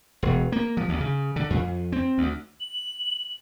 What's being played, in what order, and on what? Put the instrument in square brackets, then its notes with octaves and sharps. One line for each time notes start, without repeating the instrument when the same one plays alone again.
[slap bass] E1
A#3
F3
D2
C#3
D3
F2
C4
D2
[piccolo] F#7